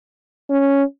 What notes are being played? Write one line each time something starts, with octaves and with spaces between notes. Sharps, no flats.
C#4